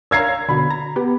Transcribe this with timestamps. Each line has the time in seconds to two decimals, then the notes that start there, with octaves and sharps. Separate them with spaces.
0.11 C#5 F5 A#5 E6 G#6 C7
0.49 B2 D3 B5
0.70 A#5
0.96 B3 G4